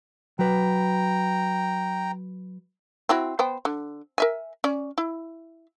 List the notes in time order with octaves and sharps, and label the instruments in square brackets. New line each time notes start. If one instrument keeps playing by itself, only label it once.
[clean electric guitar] F#3 B4 [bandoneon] G5 A#5
[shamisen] C4 E4 F#4
B3 C5 G5
D3
A#4 E5 G#5
C#4 D5
E4